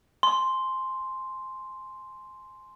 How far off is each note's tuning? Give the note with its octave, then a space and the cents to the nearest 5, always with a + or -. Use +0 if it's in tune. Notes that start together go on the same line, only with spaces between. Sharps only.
G#5 +30 C6 +0